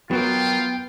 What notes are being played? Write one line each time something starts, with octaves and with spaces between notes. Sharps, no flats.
F#3 B3 F4 F#4 A#4 G5